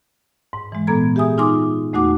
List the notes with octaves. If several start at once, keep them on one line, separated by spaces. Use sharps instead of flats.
G#2
E3 G#3
A#2 B3 A4 A#5 G#6
G4 G#4 E5 G#5 D#6
D#4 F4 G#5 C6 D6 D#6
E2 A3 D#4 F#4 F#5 D6